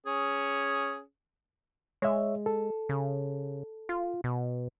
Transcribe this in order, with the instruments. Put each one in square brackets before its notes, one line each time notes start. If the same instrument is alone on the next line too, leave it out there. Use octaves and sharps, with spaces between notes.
[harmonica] C#4 G#4
[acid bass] G#3 [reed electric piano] C#5 E5
[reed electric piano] A4
[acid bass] C#3
F4
B2